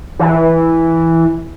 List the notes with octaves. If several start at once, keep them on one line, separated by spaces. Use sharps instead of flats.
E3